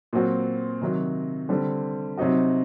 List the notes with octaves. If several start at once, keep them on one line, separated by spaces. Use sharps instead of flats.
A#2 F#3 C4 F#4
C3 D#3 F#3
D3 G3 C4
C3 F#3 C4 D#4 F#4